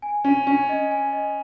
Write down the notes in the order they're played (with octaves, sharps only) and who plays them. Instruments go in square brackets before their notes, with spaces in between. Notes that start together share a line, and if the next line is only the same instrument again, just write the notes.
[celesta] G#5
[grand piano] C#4 [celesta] G#5
[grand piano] C#4 [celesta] G#5
[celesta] D#5
G#5
D#5